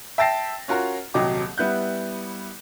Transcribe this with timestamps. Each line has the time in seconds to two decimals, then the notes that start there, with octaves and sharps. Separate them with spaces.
0.18 E5 G5 A5 A6 A#6 C7
0.68 C#4 F4 F#4 A#4 A#5
1.14 D#1 C2 F#3 D#5 G5 D6
1.58 G3 B3 E4 F#6 G6